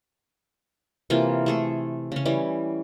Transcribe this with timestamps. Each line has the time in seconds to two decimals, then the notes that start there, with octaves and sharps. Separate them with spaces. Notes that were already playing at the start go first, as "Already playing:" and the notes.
1.10 C3 E3 A#3 F4
1.46 A3 G#4 A4
2.12 C#3 C#4
2.25 E3 G3 C#4